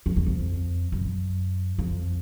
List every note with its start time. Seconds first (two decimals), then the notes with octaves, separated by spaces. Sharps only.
0.06 F2
0.16 E2
0.26 F2
0.92 F#2
1.79 F2